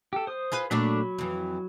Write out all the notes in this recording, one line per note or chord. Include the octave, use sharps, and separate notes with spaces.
G4 A4
C5 D#6
F4 G#4 B4
A#2 F#3 A3 D4 B5
F2 E3